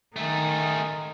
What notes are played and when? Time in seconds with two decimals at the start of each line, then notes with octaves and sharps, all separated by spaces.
0.16 D#3 A3 G#4